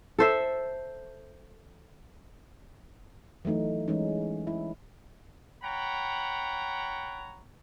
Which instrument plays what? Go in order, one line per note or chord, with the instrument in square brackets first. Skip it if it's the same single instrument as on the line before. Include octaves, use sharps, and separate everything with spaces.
[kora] A4 C5 E5
[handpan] E3 F#3 A3 D#4
E3 G#3 C#4 D#4
E4
[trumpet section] C#5 F#5 G5 A#5 B5